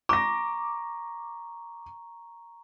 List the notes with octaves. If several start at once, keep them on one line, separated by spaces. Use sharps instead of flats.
A#5 C#6 D6 A#6